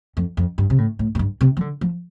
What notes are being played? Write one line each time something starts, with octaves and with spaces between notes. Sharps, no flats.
F2
F2
G2
C3
A2
A2
A2
G2
C3
F3
D3
F3